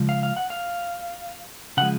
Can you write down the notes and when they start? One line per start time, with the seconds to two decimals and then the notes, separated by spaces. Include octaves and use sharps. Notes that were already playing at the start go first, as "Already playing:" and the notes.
Already playing: C#3 F3 G#3
0.09 F5
0.23 F5
0.37 F#5
0.50 F5
1.77 C#3 F3 G#3 F#5